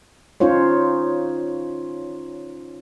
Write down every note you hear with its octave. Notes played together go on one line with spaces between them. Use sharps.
C#4 D#4 F4 C5 C#5